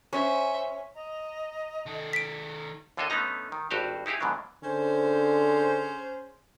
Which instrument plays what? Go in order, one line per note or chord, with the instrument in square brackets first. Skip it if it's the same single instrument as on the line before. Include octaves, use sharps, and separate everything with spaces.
[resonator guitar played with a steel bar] C#4 [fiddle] C5 E5 [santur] C#5
[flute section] D#5 A#5
[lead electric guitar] D#3 A4
[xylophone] B6 D7
[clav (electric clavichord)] D#2 D3 F4 A4 C#5 D#5
D3 A3 B3 C#4 D#4 A#5
D#3
G#1 G2 F#4 G4 C5 F5
D#4 E4 G4 G#4 F5
G#2 B2 D3 D#3 F#3 D4
[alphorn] D3 [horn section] C#4 G#4 C5